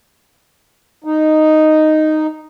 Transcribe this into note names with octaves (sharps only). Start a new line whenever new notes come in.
D#4